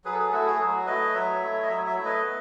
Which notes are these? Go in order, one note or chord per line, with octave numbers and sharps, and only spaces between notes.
F#3 G#4 B4
A4
G#4 B4
A3 E4 F#4 A4
G#4
F#3 F#4
A3 E4 B4 D#5
F#3 C#5 E5
A3 E4
D#5
F#3 C#5 E5
C#5 E5
A3 E4
B4 D#5
B3